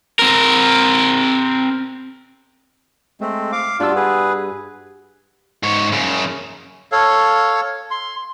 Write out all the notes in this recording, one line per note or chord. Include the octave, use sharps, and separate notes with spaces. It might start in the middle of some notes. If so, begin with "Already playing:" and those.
C4 A#4
G#3 A3 C4
F5 D6
G2 D4 F4 F#4 E6
G#4 B4
G#2 C#5
F#2 C#3
A4 C#5 F5
C6